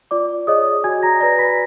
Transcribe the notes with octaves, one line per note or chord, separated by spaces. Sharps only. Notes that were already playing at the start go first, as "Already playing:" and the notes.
F4 D5 D6
G#4 C#5 D#5 D#6
F#4 G#5 G#6
A#5 A#6
B4 D5 A#5 A#6
B5 B6